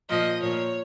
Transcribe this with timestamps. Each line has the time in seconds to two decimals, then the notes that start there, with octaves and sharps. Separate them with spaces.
0.09 A#2 F3 D#5
0.42 A#2 F3 C#5